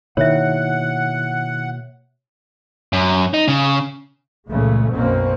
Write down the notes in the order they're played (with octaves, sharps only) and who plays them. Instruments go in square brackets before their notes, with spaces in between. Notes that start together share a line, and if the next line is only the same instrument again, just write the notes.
[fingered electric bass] B2 A#3 [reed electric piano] D#3 E4 [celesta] C#5 E5 [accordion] F#5
[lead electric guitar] F#2
D#4
C#3
[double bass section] C#2 A#2 C#3 E3 G#3 A3
B1 F#2 B2 A#3 C4 C#4